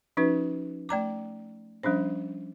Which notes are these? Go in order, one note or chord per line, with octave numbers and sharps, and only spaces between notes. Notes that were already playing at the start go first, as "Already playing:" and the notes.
F3 C#4 D#4 F#4 B4
A3 D5 A#5 D6
F3 G3 C#4 D4 C5